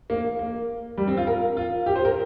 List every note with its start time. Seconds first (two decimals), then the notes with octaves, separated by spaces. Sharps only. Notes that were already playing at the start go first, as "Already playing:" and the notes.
0.10 A#3
0.39 A#3
0.98 G3
1.07 C4
1.17 F4
1.27 A#4
1.57 F4
1.86 G4
1.95 C5
2.05 A#4